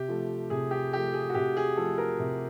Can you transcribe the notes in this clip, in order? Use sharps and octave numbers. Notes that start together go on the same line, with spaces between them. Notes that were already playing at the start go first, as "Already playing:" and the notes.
Already playing: C3 G4
F3 A3
C3 G#4
G4
F3 A3 G4
G#4
F#4
C3 G4
G#4
F3 A3 A4
A#4
C3